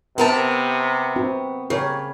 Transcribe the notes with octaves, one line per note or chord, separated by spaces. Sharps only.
C3 B3 C4 A#4 A5
C4 F#4
C#3 G4 A#4 C#5